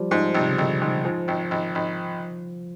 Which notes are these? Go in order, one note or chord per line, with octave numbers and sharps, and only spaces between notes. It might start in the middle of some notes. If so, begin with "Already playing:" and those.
Already playing: F3 G3
G#2 F3
G#1 C3
C#3
G#1 D3
G#2
G#2 F3
G#1
G#1
G#1